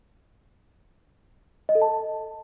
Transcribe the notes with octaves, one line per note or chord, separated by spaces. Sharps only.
D#5
A4
A5